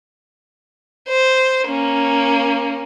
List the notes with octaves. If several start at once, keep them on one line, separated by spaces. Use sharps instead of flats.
C5
A#3 C#4